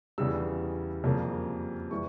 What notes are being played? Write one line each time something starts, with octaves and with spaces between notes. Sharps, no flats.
E2 C#3 G3 E6
F2 C#3 G3 A#3
E3 G3 C#6